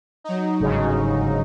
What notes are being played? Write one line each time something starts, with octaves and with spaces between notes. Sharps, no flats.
F#3 D#4
G1 G#2 C#3